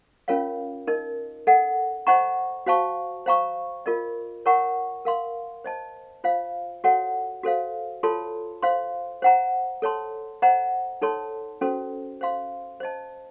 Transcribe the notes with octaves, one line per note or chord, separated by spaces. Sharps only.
C#4 F4 A#4 C#5 F5
D#4 A#4 D#5
A4 D#5 F#5
C5 D#5 F#5 A#5 C#6
F#4 C5 F5 A5 C#6
C5 F5 A#5 C#6
F4 A#4 D#5
A#4 C#5 F#5 A#5 C#6
A#4 F5 C6
C5 D#5 A5
F4 C5 F5
F#4 A4 C#5 F#5
F#4 A4 C5 F5
F4 A4 C#5 A5 C6
C5 F5 C6
C5 F#5 A#5
A4 C#5 A5 C6
C5 D#5 F#5 A#5
D#4 A4 C#5 A5 C6
C#4 F#4 A4 C5
C5 F5 C6
C5 D#5 A5